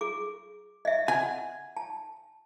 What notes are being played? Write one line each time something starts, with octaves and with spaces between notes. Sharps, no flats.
G#4 D6
D#5 E5
F#5 G#5
A5